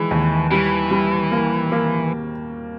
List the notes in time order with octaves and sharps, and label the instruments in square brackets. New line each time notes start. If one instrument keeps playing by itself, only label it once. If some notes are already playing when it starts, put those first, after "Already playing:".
Already playing: [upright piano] D#3 G#3 [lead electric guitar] E3
[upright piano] D#2
[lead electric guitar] E3 [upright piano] G3
[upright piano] G3
A#3
A#3